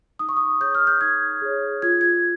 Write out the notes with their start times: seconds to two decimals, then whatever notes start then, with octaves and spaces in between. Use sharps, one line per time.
0.19 D#4 D#6
0.29 C#6
0.37 D#6
0.60 G#4 C#5 G6
0.75 F6
0.87 G6
1.01 D#4 G#6
1.42 G#4 C#5
1.82 F4 G#6
2.01 G#6